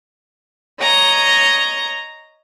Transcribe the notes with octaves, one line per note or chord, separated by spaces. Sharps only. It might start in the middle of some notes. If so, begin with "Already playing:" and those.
C#5 D#5 A#5